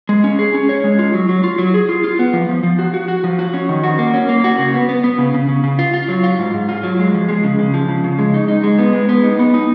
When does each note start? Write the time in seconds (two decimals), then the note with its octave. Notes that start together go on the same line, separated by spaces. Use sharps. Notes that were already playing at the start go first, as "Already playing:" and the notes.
0.09 G#3
0.24 C#4
0.39 G#4
0.54 C#4
0.69 C#5
0.84 G#3
0.99 F4
1.14 F#3
1.29 F#3
1.44 F4
1.58 F#3
1.74 G#4
1.89 F4
2.04 F4
2.19 B3
2.33 F3
2.49 F3
2.63 F3
2.79 F#4
2.94 F#4
3.08 F#4
3.24 F3
3.39 F#4
3.54 C#4
3.69 D#3
3.84 F#4
3.99 A#3
4.14 C#4
4.29 A#3
4.44 F#4
4.59 C#3
4.74 B3
4.89 B3
5.04 B3
5.18 C#3
5.34 C#3
5.49 C#3
5.64 C#3
5.79 F4
5.94 F4
6.08 F#3
6.24 F4
6.39 G#2
6.54 G#2
6.69 F4
6.83 F#3
6.99 G#3
7.14 F3
7.29 G#3
7.44 C#3
7.59 C#3
7.74 F3
7.89 C#3
8.04 C#3
8.19 G#3
8.34 D#4
8.48 D#4
8.64 G#3
8.79 B3
8.93 G#3
9.09 B3
9.24 D#4
9.39 B3
9.54 D#4